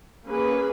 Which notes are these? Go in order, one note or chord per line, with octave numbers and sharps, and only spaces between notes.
A#3 C#4 G#4 B4